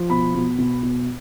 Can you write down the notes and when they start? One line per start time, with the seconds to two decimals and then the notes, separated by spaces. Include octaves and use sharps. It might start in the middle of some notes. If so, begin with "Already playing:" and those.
Already playing: F3
0.10 B2 B5
0.35 B2
0.58 B2
0.83 B2